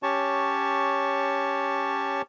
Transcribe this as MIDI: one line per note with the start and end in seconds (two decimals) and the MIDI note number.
0.03 2.22 61
0.03 2.22 67
0.03 2.22 73
0.03 2.22 81
0.03 2.22 85